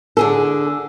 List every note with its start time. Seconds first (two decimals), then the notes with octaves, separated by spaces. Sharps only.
0.17 D3 G#4 A4